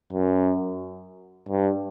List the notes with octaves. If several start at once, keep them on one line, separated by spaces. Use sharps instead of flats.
F#2
G2